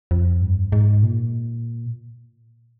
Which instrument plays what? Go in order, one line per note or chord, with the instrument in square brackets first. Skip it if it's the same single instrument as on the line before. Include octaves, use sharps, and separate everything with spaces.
[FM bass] F2
G2
G#2
A#2